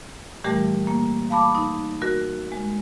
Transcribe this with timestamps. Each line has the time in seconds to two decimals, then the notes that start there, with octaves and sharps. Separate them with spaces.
0.44 A#2 E3 G3 A3 G4 A#4
0.87 A#3
1.30 F5 A5 B5 D6
1.55 D#4
2.02 F#4 A#4
2.52 G#3